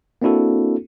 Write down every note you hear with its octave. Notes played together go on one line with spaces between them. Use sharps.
A#3 C4 D4 E4 F#4 A4